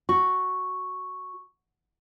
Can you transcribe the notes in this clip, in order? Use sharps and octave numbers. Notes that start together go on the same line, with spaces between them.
F#4 C#6